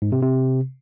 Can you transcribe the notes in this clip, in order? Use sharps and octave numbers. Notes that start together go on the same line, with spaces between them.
G#2
C3
C3